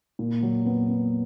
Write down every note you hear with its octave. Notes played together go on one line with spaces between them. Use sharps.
A#2
F#3
B3
B3